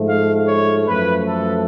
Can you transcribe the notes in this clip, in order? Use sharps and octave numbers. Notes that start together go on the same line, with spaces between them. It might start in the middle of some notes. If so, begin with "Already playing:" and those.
Already playing: G#2 F3 A3
F5
C#5
F#2 F3 A3 B4
A4